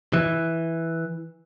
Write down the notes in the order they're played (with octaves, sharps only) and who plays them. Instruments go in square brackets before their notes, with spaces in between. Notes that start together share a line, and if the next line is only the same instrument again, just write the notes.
[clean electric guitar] E3